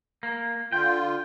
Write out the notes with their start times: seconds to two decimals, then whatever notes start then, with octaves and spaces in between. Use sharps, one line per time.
0.23 A#3
0.72 D3 F4 G5